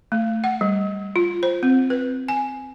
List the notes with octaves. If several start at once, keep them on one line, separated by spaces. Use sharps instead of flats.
A3
F#5
G3
F4
C5
C4
B4
G#5